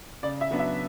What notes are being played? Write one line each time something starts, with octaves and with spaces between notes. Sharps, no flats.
C#3 D5
E5
F#3 B3 D4
E5